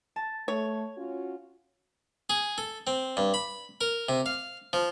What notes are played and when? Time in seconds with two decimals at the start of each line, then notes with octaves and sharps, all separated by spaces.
0.16 A5
0.48 A3 C#5
0.97 C#4 F4 F#4
2.30 G#4
2.58 A4
2.87 C4
3.17 G2
3.34 B5
3.81 A#4
4.09 C3
4.26 F5
4.73 F3